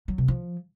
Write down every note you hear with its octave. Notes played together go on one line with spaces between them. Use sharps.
F#3
C3
F3